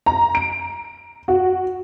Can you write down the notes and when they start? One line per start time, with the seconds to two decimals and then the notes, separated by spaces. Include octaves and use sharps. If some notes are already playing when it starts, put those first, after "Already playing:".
0.06 A#5
0.35 D7
1.28 F#4